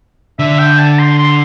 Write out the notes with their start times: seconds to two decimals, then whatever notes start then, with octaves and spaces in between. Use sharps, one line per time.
0.39 D3 E5
0.59 G5
0.79 A5
0.99 C6
1.19 C6